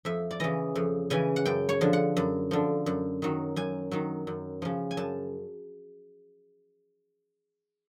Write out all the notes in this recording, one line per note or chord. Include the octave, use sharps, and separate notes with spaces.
F2 E5
D5
C#3 E3 D#5
F2
C#3 E3 G#5
F#5
F#2 G5
C#5
D3 F3
F#5
F#2
D3 F3
F#2
D#3 F#3
F#2 G#5
D#3 F#3
F#2
C#3 F3
G#5
F#2 A5